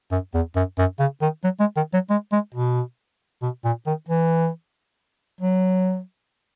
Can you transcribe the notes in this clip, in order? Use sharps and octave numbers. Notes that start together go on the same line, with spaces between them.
F#2
E2
F#2
F#2
C#3
D#3
F#3
G#3
D#3
F#3
G#3
G#3
B2
B2
A#2
D#3
E3
F#3